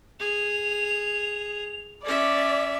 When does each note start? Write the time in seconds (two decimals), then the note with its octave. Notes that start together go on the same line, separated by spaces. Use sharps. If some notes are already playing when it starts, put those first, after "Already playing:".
0.20 G#4 F7
2.04 C#4 D5 E5